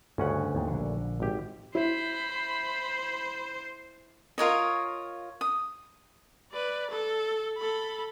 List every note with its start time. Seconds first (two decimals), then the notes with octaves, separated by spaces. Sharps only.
0.18 D2 G2 C#3 C#4 F#5
0.54 D#2 G#2
0.67 A#1 D3
1.20 G#1 G4
1.75 E4 C5 B5
4.38 F4 A#4 C#5 D#5
5.41 D#6
6.51 B4 D5
6.90 A4
7.57 A4 B5